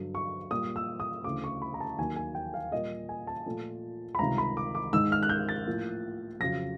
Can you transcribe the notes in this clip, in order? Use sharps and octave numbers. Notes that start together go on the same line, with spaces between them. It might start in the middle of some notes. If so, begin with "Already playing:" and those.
Already playing: G2 D3 F#3
C#6
A#2 G3 A#3 D#6
E6
D#6
D2 C#3 E3 A3 D6
C#6
B5
A#5
A5
D#2 D#3 F#3 A#3 G#5
G#5
G5
F5
A#2 G3 A#3 D#5
G#5
A5
A#2 F3 A3
B5
C#2 C3 D#3 G3 A#5
B5
D6
D6
G#2 D#3 G#3 E6
F6
F#6
G6
A6
A2 F3 A#3
F2 C#3 F#3 A#6